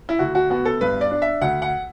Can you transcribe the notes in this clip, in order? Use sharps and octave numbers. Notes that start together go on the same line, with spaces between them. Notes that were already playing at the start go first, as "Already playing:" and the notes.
E4
D2 F#4
F#4
B3 F#4
A4
G2 B4
D5
D4
E5
D2 F#5
F#5